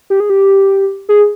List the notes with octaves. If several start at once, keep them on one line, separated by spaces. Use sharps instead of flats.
G4
G#4
G4
G#4